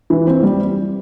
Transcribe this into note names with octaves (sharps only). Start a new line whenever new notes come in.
E3
C4
G3